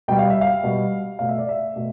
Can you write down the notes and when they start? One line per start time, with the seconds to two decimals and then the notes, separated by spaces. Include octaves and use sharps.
0.08 B2 G3 G5
0.19 F5
0.30 E5
0.41 F5
0.64 B2 G3
1.19 B2 A3 F5
1.29 E5
1.38 D5
1.49 E5
1.76 B2 A3